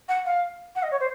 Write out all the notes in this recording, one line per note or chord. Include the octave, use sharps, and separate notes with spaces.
F#5
F5
F#5
D#5
C#5
C5